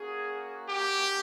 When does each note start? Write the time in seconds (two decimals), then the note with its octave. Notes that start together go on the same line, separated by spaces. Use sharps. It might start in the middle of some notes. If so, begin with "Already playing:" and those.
Already playing: A#3 C#4 F#4 G#4
0.69 G4